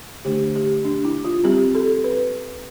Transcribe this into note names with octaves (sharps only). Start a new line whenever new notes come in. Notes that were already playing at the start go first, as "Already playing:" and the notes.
D3 A3 D4 G4
G4
D4
E4
F4
G3 C4 G4
A4
B4